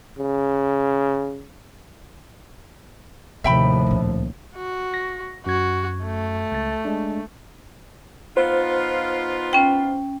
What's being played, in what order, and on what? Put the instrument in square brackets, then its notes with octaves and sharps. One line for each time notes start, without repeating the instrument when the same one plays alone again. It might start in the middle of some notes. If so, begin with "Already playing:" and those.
[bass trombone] C#3
[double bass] D#2 A2 [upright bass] C3 [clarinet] F3 [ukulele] E5 G5 B5
[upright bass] C#2 A#2
[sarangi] F#4
[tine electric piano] A#6
[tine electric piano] F#2 G#6 [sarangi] F#4
[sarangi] A3
[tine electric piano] C#2 A6
G#3 D4
[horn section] B3 D#4 F4 [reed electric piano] C5
[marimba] C#4 G5